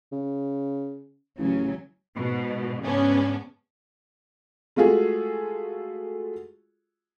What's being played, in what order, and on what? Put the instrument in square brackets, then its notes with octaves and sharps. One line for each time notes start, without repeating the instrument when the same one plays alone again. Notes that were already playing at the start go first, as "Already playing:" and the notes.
[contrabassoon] C#3
[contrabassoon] A1 [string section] C#3 F#3 C#4
[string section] G#2 B2
G#2 C#3 B3 C#4 D4
[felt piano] G#3 A3 F4 F#4 G#4 A4